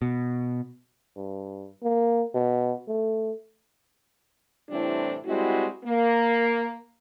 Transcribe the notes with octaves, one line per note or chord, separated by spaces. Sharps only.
B2
G2
A#3
B2
A3
A2 C3 E3 G3 C4 D4
G3 G#3 C4 E4 F#4
A#3